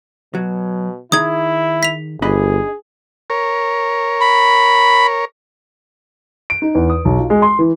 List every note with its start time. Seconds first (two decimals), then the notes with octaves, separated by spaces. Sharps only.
0.35 B2 F#3
1.12 D#3 D#4 E4 G#4 D#6 G#6
1.83 B6 F7
2.22 G1 D4 G#4 D#5 B5
3.30 A#4 C#5
4.21 B5
6.50 D7
6.62 D#4
6.75 E2
6.90 D#6
7.05 B1
7.18 F4
7.30 G#3
7.42 C6
7.59 E3